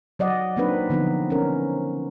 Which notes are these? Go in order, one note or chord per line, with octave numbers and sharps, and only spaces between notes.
F#3 D5 D#5 F#5
F#3 A#3 C4 D4 D#4 B4
D3 F3 B3 C4 D#4
C#4 A#4